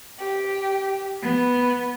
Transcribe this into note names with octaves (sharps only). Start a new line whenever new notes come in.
G4
B3